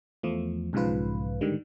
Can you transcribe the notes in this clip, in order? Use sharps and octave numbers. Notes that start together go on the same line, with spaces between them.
E2 F3 A3
B1 G#2 C#3 F3 F4 B4
G#2 D3 D#3 G3